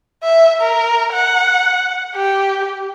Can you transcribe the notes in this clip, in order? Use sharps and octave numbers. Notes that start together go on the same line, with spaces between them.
E5
A#4
F#5
G4